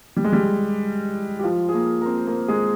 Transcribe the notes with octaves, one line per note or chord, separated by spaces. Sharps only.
G3
G#3
G3
G4
F3 F4
G#4
A#3 A#4
A#4
C4 C5
A#3 A#4
G#3 G#4